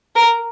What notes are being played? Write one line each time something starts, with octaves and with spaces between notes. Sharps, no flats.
A#4